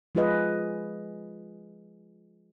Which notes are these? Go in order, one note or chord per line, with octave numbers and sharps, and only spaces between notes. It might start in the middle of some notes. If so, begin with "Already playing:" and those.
F3 G#3 F4 G#4 B4 D#5